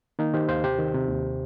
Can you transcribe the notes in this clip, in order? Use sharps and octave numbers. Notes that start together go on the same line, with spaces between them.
D#3 A#3 D#4
D#3 G4 C5
D#2 C5 F5
C3 G4 C5
D#3
C3
D#2